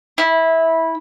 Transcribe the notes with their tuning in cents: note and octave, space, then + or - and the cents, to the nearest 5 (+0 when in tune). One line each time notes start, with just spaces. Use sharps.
E4 -15